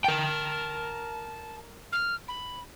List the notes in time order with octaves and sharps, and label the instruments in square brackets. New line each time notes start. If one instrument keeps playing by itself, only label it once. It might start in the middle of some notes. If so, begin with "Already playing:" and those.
[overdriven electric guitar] A#4 G5 [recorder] A5
[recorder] F6
B5